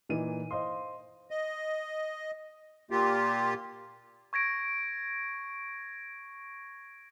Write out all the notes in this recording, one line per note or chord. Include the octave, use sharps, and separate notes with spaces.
A#2 E3 D#4 D#7
C5 D#5 F5 C6
D#5
A#2 A#3 F4 G4
C#6 G#6 A#6 D7